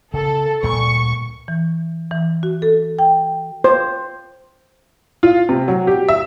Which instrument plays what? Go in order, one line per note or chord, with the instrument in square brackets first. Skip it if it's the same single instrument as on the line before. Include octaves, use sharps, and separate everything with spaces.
[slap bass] C#3 [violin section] A4
[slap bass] D2 A#2 G3 [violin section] C#6
[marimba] E3
E3
F#4
A4
G5
[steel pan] C5
[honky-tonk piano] F4
C3
F#3
G4
E5